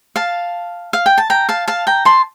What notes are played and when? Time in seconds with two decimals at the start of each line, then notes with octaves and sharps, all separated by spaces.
0.16 F5 A5
0.93 F5
1.06 G5
1.18 A5
1.30 G5 A#5
1.49 F5 A5
1.68 F5 A5
1.87 G5 A#5
2.05 A5 C6